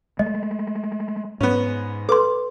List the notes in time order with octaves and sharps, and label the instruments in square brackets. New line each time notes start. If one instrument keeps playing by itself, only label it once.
[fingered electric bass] G#3 A3 [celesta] D#5
[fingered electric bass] G#2 [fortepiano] B3 C#4
[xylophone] A4 C6 [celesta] B4 [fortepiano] D6